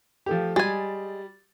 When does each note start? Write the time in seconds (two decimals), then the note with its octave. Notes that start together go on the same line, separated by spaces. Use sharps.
0.26 F3 A3 G4
0.56 G3 G#3 G#5 A6